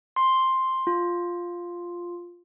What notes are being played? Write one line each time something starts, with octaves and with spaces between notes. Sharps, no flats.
C6
F4